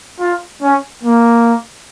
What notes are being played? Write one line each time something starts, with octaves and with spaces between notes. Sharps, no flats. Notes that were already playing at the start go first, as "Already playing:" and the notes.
F4
C#4
A#3